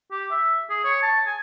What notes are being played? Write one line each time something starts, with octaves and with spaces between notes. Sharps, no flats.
G4
E5
G#4
C#5
A5
G#5